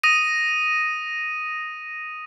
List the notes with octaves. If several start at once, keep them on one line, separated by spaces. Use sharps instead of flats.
D#6 A#6 D#7